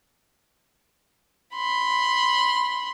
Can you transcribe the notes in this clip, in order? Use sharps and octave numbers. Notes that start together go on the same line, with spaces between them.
B5 C6